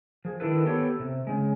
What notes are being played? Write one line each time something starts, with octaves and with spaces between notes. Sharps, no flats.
F3 G#4
D#3 D4 E4 A4 B4
B3 G4 A4 C#5
C3
C#3 G#3